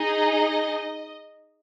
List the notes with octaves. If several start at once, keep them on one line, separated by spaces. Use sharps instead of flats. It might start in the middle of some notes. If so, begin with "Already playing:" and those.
Already playing: D#4 G#4 D#5